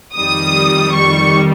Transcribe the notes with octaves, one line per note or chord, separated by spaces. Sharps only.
F2 D#3 G3 D#6
C#6